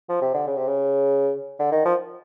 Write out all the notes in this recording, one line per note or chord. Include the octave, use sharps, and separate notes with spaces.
F3
C3
D3
C#3
C3
C#3
D3
D#3
F3